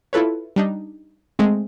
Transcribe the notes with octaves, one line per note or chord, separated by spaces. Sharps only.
E4 F4 A4 B4 C#5
G3 D4 D#4
G#3 A3 C4